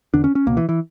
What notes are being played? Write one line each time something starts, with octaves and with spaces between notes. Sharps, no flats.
E2 D3 D4
C#4
C#4
C#2 B2 A#3
E3
E3